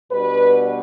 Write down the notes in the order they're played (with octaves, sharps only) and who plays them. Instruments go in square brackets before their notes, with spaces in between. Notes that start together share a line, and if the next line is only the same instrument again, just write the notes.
[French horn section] B2 G3 B3 D4 B4